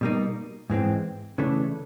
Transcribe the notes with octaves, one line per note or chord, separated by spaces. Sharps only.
B2 G3 A#3 D#4
G#2 E3 G#3 C4
C#3 E3 A3 D4